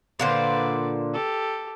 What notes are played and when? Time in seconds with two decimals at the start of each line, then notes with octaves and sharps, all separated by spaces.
0.20 A#2 D3 B4 C5 D5
1.14 G4 A4